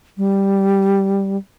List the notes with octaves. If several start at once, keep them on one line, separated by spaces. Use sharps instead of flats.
G3